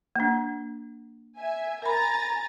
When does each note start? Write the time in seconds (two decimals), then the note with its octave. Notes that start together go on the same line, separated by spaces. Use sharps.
0.16 A#3 D4
1.37 E5 G#5
1.82 A#4 G#5 A#5 B5 A6